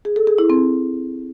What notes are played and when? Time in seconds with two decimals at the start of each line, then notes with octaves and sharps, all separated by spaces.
0.05 G#4
0.16 A4
0.27 G#4
0.38 E4
0.50 C4